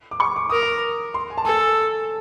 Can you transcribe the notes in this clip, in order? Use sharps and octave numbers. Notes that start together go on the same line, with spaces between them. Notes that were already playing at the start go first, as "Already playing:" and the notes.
D6
C#6
D6
A#4 D#6
D6
C6
G#5
A5
A4 G#5